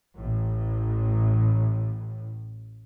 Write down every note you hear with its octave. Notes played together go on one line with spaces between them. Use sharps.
A1 A2